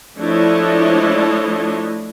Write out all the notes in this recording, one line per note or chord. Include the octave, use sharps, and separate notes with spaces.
F3 A3 D4 E4 C#5 D#5